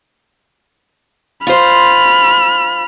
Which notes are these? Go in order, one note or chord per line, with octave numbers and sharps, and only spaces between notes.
F4 C5 B5 F6